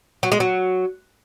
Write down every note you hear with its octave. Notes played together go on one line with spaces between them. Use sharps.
F#3
G#3
F#3